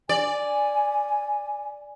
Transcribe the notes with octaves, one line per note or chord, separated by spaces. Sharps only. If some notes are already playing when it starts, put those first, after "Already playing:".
D5 G#5